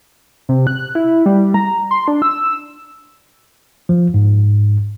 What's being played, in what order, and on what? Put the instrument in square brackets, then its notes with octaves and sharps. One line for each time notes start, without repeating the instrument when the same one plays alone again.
[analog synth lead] C3
F#6
E4
G3
A#5
C6
D4
E6
[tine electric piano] F3
G#2